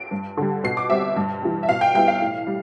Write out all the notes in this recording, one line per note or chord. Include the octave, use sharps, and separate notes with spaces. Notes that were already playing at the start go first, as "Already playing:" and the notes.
Already playing: D7
G2
D3 G3
B2 C7
D6
G3 C4 E5
G2
E3 G3
E5
B2 F5
G5
G3 B3 E4 G5
F5
A2
G3